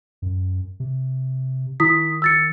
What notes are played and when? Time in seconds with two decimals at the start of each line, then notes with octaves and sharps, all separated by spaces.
0.22 F#2
0.80 C3
1.80 D#3 E4 D#6 B6
2.22 E6 A6 C#7